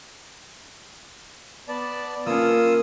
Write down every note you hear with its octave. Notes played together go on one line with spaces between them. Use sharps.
B3 D5 A5
A#3 C#4 F4 D#6 E6